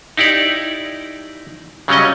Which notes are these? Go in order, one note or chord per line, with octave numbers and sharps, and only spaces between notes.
D#4 E4 G4 D5
C#3 F#3 G3 C#4 D#5